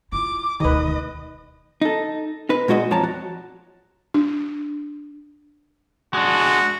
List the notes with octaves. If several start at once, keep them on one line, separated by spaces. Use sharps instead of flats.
E4 F4 D6
E1 D2 D#3 B4 D#5
D#4 A4
D#4 B4
A#2 G#3 F#4 C#5 D#5
F2 F3 C#5 D5 A5 A#5
F#4
D4
G#3 D4 F#4